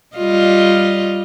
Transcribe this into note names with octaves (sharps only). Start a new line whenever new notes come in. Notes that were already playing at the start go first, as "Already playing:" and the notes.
G3 F4 D#5